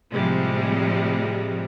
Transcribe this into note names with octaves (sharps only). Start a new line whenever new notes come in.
A2 C3 F3 G3 G#3